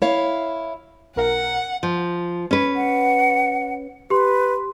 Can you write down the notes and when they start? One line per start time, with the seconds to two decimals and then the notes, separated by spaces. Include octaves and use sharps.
0.02 E4 C#5 F5
1.16 B1 A#4 F#5
1.83 F3
2.51 C#4 B4
2.76 F#5
4.10 G4 B4 C6